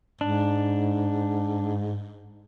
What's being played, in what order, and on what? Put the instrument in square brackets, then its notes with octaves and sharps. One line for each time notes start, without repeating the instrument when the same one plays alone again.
[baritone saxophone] G#2 [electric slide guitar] D4